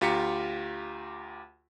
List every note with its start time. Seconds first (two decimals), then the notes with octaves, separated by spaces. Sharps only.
0.01 D2 F4 G4 A#5 B6 C#7